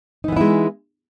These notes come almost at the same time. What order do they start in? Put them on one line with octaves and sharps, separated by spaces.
D#4 E3 B3 E4 G#3